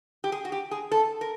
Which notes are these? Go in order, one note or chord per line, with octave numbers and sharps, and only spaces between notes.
G4
G#4
F#4
G4
G#4
A4
A#4